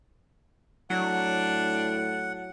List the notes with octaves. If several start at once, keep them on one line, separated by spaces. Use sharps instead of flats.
A2 F#3 D4 F#5